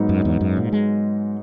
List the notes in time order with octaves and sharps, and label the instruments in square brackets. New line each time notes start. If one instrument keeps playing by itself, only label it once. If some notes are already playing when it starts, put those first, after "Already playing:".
Already playing: [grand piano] G#2 F#3 B3 D#4
[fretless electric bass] F#2
E2
F#2
A#2
G#3